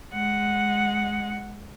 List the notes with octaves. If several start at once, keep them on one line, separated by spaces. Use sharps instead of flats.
G#3 F#5